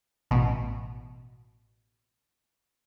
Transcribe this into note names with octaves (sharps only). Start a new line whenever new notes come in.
A1 B2